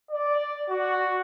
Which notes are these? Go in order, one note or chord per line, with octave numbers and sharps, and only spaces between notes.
D5
F#4